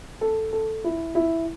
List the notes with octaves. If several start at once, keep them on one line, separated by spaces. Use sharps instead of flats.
A4
A4
E4
E4